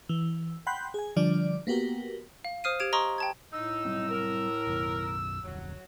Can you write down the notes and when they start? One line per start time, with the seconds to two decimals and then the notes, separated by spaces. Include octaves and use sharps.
0.09 E3
0.67 F#5 G5 B5 C6 F#6 G6
0.94 G#4 G#5
1.16 D3 F3 G3 D4 D5
1.67 A#3 B3 F#4 G4 A#4
2.45 F5
2.64 C5 D#6 F6 C7 D#7
2.79 G4 G#6 D7 E7
2.93 D#5 A#5 C6 C#6 D#6
3.18 G5 A5 G#6
3.52 A2 D#4 E6
3.85 F#3 G3 C4
4.09 A#4
4.67 B1 F#2 B2
5.43 F1 D2 F#3